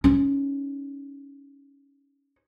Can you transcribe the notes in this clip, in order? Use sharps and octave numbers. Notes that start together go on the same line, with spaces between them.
C#4 D#4